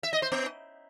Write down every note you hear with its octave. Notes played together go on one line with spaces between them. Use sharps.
E5
D#5
C5
B3